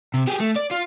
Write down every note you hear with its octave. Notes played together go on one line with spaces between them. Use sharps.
C3
G4 G#4
A3
D5
F4